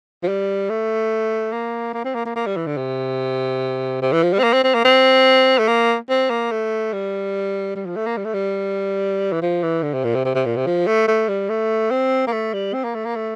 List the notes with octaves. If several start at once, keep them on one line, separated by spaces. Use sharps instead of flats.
F3
G3
A3
A#3
A#3
C4
A#3
A#3
A#3
G3
E3
D3
C3
C3
E3
F3
G3
C4
A#3
C4
C4
A#3
C4
A3
A#3
C4
A#3
A3
G3
G3
F3
A3
A#3
G3
A3
G3
E3
F3
E3
D3
C3
A#2
C3
C3
C3
A#2
C3
F3
A3
A3
G3
A3
C4
A#3
A3
G3
C4
A#3
A3
A#3
A3